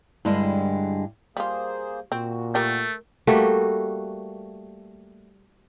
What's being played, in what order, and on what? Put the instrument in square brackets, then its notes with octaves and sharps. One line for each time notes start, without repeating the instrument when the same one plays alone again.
[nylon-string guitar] G2 D3 G3 G#3 E4
[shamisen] G3 F4 [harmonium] A#3 G#4 C5
[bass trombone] A#2 [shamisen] C4 [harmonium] F#4
[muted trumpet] A3 [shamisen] G4 A#4 G5
[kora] G3 A3 A#3 F#4